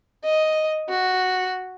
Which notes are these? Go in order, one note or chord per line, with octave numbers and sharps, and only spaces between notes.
D#5
F#4